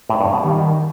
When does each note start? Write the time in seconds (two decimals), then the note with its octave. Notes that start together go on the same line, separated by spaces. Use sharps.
0.09 A2
0.21 G2
0.33 B2
0.43 D#3 G3